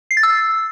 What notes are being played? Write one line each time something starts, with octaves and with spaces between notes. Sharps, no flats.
C7
A6
E6